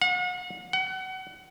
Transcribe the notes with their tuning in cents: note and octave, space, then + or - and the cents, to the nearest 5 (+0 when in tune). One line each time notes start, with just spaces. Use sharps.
F#5 -40
F#5 +30